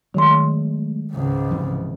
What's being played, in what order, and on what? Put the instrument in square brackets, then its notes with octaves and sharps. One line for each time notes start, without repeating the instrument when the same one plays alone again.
[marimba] D#3 C6 [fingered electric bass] F#3 G#3 A3
[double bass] C#2 G#2
[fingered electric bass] C3 E3 F3